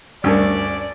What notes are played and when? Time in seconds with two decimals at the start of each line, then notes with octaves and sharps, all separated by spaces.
0.24 D2 G2 C#4 D4 A#4 D5 C#6